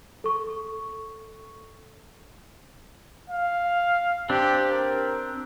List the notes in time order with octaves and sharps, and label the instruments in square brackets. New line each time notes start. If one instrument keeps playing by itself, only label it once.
[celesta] A4 C#6
[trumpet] F5
[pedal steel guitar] C4 D4 [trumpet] G4
[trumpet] A#4